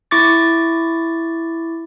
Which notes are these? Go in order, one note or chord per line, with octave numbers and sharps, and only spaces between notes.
E4 C#6 D6 A6